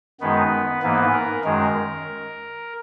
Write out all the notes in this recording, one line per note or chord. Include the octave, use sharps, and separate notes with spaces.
F#2 D#3 G#3 B3 D#4 B4
G#2 E3 A#3 B3 B4
A#4
F#2 D#3 G#3 A#4